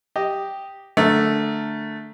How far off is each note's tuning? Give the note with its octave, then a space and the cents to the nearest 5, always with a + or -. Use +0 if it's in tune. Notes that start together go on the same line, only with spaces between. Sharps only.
G4 +0 D#5 +0
D3 +0 A3 +0 A#4 -10